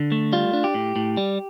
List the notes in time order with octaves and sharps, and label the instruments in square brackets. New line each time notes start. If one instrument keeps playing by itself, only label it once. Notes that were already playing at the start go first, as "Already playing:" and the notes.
Already playing: [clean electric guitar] D3
A3
G3 F4
D4
G4
A2
A2
G3